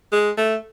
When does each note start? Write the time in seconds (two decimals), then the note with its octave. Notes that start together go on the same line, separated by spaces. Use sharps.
0.12 G#3
0.37 A3